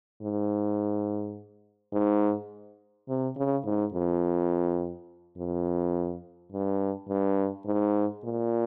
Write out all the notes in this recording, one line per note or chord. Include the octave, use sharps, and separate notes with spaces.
G#2
G#2
C3
C#3
G#2
F2
F2
G2
G2
G#2
A#2